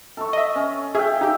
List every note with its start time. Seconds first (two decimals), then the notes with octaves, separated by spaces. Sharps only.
0.17 A4 C#6
0.33 D#5 E5
0.56 C#4
0.95 G#4 E5 F5 G5
1.21 D#4 G4